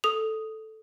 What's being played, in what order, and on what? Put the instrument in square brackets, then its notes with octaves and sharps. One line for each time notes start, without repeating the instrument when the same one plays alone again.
[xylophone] A4 D#6 F7